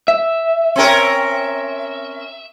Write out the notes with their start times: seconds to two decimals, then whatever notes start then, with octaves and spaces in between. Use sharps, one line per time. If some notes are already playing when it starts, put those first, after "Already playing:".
0.08 E5
0.76 C4 C#4 A#4